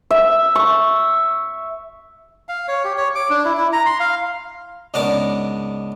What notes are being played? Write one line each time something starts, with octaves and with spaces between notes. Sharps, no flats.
E5
C#6
F5
C#5
G4
C#5
D6
D4
E4
E4
A#5
C6
F5
C#2 G#2 B3 D4 A#4 D6